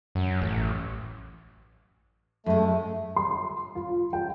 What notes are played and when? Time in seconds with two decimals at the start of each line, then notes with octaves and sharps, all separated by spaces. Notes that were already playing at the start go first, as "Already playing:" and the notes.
0.15 F#2
0.42 A1
2.46 F#2 G#3 A3
3.16 C6
3.75 F4
4.13 G5